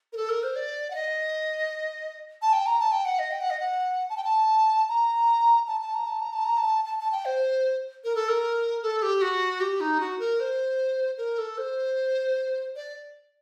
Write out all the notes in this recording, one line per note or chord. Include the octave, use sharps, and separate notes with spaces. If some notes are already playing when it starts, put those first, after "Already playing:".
A#4
A4
A#4
C5
D5
F#5
D#5
A5
G5
A#5
A5
G5
F#5
D#5
G5
F#5
D#5
F#5
A5
G5
A5
A#5
A5
A5
A#5
A5
A#5
A5
A#5
A5
A5
A5
G5
C5
A#4
A4
A#4
A4
G4
F#4
G4
D#4
F#4
A#4
C5
A#4
A4
C5
D5